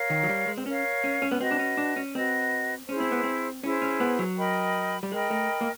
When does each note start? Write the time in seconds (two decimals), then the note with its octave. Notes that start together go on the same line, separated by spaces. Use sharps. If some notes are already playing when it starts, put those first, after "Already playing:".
Already playing: A#4 C#5 F5
0.10 D#3
0.23 F#3
0.29 G3
0.47 G#3
0.58 C4
0.66 C#4 A#4 C#5 F5
1.04 C#4
1.22 C#4
1.31 B3
1.40 C4 F#4 B4 D#5
1.51 D4
1.59 C#4
1.77 D4
1.96 C#4
2.14 C4 F#4 B4 D#5
2.89 C#4 E4 G#4 C5
3.00 C4
3.12 B3
3.24 C4
3.63 C#4 E4 G#4 C5
3.82 C#4
4.00 B3
4.19 F#3
4.37 A#4 D#5 G5 B5
5.03 G3
5.12 G#3 A#4 D#5 G5 B5
5.30 A3
5.61 A#3